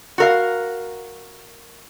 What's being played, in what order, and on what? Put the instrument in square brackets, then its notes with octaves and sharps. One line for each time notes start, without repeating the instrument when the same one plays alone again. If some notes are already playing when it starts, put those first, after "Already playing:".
[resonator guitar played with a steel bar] F#4 A#4 F5